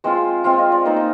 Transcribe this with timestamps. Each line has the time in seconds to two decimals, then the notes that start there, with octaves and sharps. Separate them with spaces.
0.04 G#3 C4 F4 C5
0.44 G#3 C4 F4 F5
0.59 D#5
0.72 D5
0.85 A#3 D#4 C5
0.96 D#5